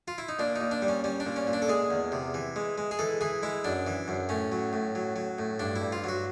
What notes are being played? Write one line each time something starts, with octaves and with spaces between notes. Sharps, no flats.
F4
E4
D#4
A#2 D4
A#2 D#4
D4
G3
C#4
G3 C#4
D4
A#2
C#4
A#2
D4
A4
G#3 G#4
E2
C3
E3
G#3
G#3
G#4
E3 A4
E3 G#4
G#3 E4
F#2 D4
E3
F#2
A2 C#4
F#3
A2
F#3
F#3
A2
G2 D4
E4
G2
F4
F#3 F#4